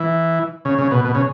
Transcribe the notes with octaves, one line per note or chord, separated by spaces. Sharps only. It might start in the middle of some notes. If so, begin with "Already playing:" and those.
Already playing: E3
C#3
C#3
B2
B2
C#3